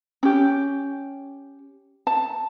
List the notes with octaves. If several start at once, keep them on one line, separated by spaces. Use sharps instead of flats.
C#4 G4
A5